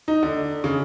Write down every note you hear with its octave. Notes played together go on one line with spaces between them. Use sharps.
D#4
D3
C#3